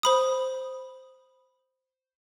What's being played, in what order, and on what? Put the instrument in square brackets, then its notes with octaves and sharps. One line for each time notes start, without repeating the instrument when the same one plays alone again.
[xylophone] C5 B5 D#6